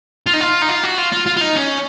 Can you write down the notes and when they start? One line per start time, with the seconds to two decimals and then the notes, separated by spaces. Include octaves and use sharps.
0.26 F4
0.33 D#4
0.40 F4
0.62 D#4
0.69 F4
0.83 F#4
0.98 F4
1.12 F4
1.26 F4
1.37 F4
1.41 D#4
1.55 C#4